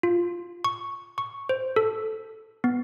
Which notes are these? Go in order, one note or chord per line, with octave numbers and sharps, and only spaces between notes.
F4
C#6
C#6
C5
A4
B3